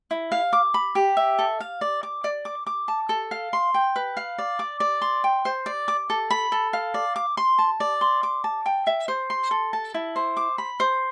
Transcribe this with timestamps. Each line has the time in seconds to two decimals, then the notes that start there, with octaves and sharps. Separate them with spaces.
0.11 E4
0.32 F5
0.53 D6
0.74 B5
0.95 G4
1.17 E5
1.39 A4
1.60 F5
1.81 D5
2.03 D6
2.24 D5
2.45 D6
2.67 D6
2.88 A5
3.09 A4
3.31 F5
3.53 C6
3.74 G5
3.96 B4
4.17 F5
4.38 D5
4.59 D6
4.80 D5
5.02 C6
5.24 G5
5.45 C5
5.66 D5
5.88 D6
6.10 A4
6.30 B5
6.52 A4
6.73 F5
6.94 D5
7.16 D6
7.37 C6
7.59 A5
7.80 D5
8.01 C6
8.23 D6
8.44 A5
8.66 G5
8.87 E5
9.08 C5
9.30 C6
9.51 A4
9.73 A5
9.94 E4
10.16 C5
10.37 D6
10.58 B5
10.80 C5